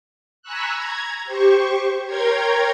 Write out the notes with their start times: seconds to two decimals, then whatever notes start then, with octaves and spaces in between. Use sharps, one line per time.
0.42 G#5 A#5 B5 C#6 E6 F#6
0.71 A#5 G#6
1.25 G4 C5 C#6
2.05 A#4 C#5 G5 A#5 C6 G#6